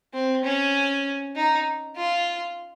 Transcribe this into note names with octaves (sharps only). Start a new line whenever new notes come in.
C4
C#4
D#4
F4